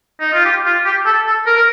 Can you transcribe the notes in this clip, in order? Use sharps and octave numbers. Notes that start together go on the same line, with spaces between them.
D#4
F4
G4
F4
G4
A4
A4
A#4
A#4